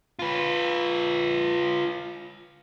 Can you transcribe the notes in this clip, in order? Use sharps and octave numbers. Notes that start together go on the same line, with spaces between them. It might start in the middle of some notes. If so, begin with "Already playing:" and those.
F4 B4